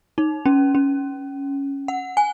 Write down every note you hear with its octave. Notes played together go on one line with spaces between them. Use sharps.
D#4
C#4
C#4
F#5
G#5